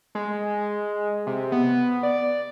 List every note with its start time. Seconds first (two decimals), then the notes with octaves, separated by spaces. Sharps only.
0.15 G#3
1.27 C3
1.52 B3
2.03 D5